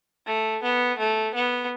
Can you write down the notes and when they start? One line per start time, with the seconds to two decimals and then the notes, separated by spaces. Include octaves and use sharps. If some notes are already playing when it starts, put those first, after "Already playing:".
0.26 A3
0.63 B3
0.99 A3
1.34 B3